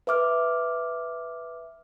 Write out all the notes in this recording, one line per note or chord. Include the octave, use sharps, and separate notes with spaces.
B4 E5 D6 F6